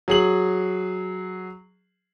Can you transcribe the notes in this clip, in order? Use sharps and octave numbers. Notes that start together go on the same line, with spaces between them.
F#3 G#4 F#7